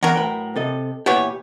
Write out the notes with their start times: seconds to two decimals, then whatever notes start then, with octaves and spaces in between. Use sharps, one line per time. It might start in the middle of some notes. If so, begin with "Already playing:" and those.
0.03 E2 F#3 F#4 A#4
0.16 A2 B4 G5
0.56 C3 A4 D#5
1.06 A#2 E3 B3 G4 C#5